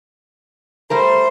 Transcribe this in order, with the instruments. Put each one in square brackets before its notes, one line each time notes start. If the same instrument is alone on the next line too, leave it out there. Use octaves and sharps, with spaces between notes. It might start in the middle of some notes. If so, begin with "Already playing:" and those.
[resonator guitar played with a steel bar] G3 A3 A#4 [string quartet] C5